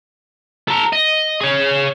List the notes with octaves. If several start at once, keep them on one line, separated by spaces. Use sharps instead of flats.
A4 A#5
D#5
G#4 C#5